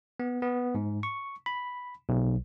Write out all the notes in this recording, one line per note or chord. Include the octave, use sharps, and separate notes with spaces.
B3
B3
G#2
C#6
B5
B1